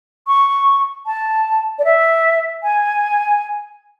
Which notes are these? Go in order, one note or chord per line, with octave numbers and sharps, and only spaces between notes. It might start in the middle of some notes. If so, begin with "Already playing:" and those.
C#6
A5
D5
E5
G#5